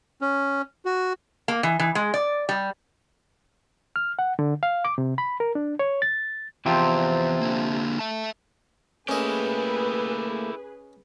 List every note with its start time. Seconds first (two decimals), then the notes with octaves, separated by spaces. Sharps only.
0.21 C#4
0.85 F#4
1.48 A#3
1.63 E3
1.80 E3
1.95 G#3
2.14 D5
2.49 G3
3.96 F6
4.19 F#5
4.39 D3
4.63 F5
4.85 D6
4.98 C3
5.18 B5
5.40 A#4
5.55 D4
5.79 C#5
6.02 A6
6.66 E2 C3 F3 C4
7.41 D3 A#3
7.99 E5 A5
9.08 A3 A#3 C#4 E4 G4 G#4 B4 D#5